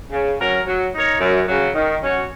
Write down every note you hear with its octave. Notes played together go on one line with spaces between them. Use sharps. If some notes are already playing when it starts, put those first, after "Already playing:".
C#3
F#3 C#4 A#4
F#3
D#4 A#4 C#5
F#2
C#3 F#3
D#3
F#3 C#4 F#4 C#5